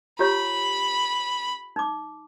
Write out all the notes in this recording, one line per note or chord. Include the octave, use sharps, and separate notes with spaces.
F4 G4 C#5 B5
D#4 D6